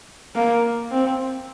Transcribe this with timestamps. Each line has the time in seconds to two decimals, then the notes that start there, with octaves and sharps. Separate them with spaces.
0.35 A#3
0.91 C4